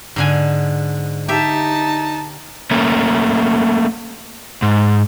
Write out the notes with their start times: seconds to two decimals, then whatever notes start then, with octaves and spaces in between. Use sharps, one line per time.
0.16 G#2 D3 G#5
1.28 D#4 G4 E5 A5
2.71 A3 A#3 C#4
4.62 G#2